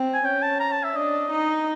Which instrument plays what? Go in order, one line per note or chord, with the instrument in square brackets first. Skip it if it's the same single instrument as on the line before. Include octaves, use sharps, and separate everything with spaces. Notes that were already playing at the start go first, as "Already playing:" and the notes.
Already playing: [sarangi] C4
[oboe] G#5
[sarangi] C#4 [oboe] G5
[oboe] A5
A#5
A5
E5
[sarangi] D4 [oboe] D#5
[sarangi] D#4